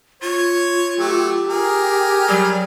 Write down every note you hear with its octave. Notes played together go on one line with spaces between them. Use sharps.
F4 C#5
F#3 A3 G4
G#4 A#4
F#3 G3